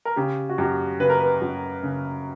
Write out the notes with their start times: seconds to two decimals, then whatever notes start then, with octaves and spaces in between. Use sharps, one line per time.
0.05 A#4
0.16 C#3 G4
0.49 F#4
0.58 F#2 G4
1.00 C#3 B4
1.10 A#4
1.19 B4
1.42 F#2
1.83 C#3